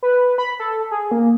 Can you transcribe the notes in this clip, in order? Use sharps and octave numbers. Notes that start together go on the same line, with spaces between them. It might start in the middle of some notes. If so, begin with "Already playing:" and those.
B4
B5
A4
G#4
A#3